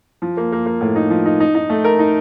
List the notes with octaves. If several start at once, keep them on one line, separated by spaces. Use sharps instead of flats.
F3
A#3
A#3
A#3
A2
D#4
F3
D#4
D#4
D#4
A3
A#4
D#4